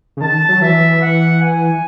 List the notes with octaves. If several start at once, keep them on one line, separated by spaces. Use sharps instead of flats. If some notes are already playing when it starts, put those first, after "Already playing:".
C#3
D#3 A5
F#3
E3 E5
F#5
G#5